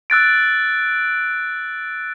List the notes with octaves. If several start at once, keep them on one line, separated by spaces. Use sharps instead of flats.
E6 F#6 A6 D7